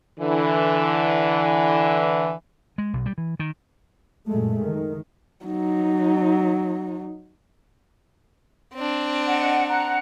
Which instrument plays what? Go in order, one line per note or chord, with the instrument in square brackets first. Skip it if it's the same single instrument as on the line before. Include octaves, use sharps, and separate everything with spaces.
[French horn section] D3 E3
[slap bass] G#3
B1
G3
E3
D#3
[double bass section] F#2 A#2 G#3 A3
D#3
[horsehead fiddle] F#3 D#4
[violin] C4 D4
[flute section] D#5 F#5
F#5 A#5 F#6